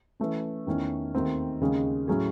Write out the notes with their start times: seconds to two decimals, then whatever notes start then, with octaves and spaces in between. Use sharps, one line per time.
0.20 E3 A3 C#4
0.67 E2 D#3 A3 C#4
1.14 D#2 D#3 A3 C4 F#4
1.61 D#2 C#3 G#3 C#4
2.08 A2 F#3 C#4 G#4